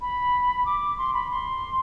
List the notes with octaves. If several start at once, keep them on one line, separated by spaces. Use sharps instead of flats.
B5
D6
C6
B5
C6